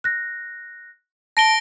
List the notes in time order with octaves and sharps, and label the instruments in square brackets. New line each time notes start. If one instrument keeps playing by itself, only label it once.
[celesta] F#6 A#6
[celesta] A5 [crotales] A#6 D7 G7